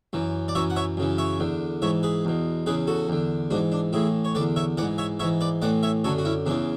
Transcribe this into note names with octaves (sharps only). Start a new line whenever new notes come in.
F#2 E3
D5
F#2 E3 C#5 E5
F#5
C#5 E5
F#2 C#3 E3
C#5 E5
E2 D3
G#2 E3 C#5 E5
G#4 B4
E2 B2
E2 C#3 E3 G#4 B4
F#4 A4
E2 D3
G#2 E3 D4 F#4
D4
A2 E3 E4 G#4
C#5
E2 D3 B4 D5
C#5 E5
G#2 E3 D5 F#5
C#5 E5
G#2 E3 C#5 E5
B4 D5
A2 E3 D5 F#5
C#5 E5
F#2 D3 A4 C#5
F#4
C#4 E4
E2 C#3 E3 D4